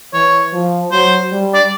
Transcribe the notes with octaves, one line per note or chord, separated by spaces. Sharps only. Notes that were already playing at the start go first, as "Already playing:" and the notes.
E3 C#5
F3
F#3 C5
G3
D5